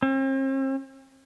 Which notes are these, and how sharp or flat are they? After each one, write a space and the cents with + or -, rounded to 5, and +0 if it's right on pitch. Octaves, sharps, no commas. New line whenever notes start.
C4 +45